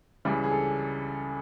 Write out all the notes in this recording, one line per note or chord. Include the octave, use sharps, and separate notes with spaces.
C#2 C#3 E3 G3 G#4
G#4
A4